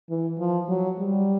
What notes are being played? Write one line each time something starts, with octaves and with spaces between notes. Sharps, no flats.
E3
F3
F#3
G3